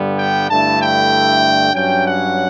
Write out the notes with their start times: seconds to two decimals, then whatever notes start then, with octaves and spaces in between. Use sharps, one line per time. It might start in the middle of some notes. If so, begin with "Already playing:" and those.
Already playing: G2 D3 G3 B3
0.18 G5
0.50 G2 D3 A3 E4 A5
0.81 G5
1.74 G2 F#3 C#4 G5
2.05 F#5